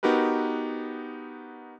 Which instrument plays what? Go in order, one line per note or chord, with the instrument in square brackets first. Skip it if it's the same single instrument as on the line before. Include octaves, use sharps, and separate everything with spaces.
[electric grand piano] B3 D#4 F#4 G4 A#4 B4